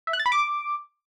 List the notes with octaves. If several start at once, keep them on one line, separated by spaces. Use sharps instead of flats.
E5
F#6
A6
B5
D6